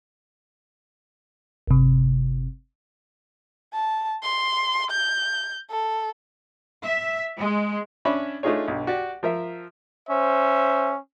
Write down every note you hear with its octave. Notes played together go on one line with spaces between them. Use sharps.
G1 C3
A5
C6
G6
A4
E5
G#3
C#4 D4 C#5 E5 B5
A3 D4 D#4 F4 G#4 C#5
B1 G2
F#4 G4 D5
F3 A#4 E5
C#4 C5 E5